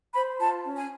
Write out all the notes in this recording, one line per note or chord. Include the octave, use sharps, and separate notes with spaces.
C5 B5
F4 A5
C#4
G#5